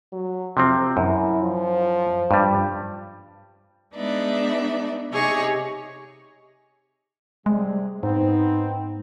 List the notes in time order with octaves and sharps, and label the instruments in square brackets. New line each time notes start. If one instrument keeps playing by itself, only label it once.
[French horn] F#3
[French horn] F2 [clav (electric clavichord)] C3 F3 C4
[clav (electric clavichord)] F#2 [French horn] E4
[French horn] F3
[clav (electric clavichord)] G2 G3
[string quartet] G#3 B3 D4 D#4 D5 E5
C3 D#4 G4 G#4 C#5 C#6
[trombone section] C3 G#4 [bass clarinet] G3 [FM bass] G#3
[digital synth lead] G#2 [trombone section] B3 C4 [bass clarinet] D#4